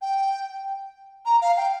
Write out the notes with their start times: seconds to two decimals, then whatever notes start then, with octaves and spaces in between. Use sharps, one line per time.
0.02 G5
1.26 A#5
1.41 F5
1.57 G5